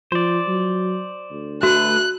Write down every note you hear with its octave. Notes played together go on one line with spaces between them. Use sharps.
F3 C5 D5
F#3
D2
A3 F#4 B4 F#6